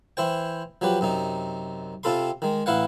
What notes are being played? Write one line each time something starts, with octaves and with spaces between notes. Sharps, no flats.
E3 E4 C5 G5
F3 F#3 G4 B4
F#2 C3 D#4
C3 C4 F4 A4 B5 C6
D#3 G#3
A1 E4 B4 F5 F#5